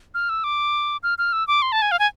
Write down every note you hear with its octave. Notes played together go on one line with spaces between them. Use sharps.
F6
E6
D6
F6
F6
E6
D6
C6
A5
G#5
F5
G#5